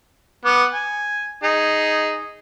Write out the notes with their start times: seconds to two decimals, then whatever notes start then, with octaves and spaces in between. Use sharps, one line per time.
0.45 B3 D6
0.74 G#5
1.43 D#4 G#4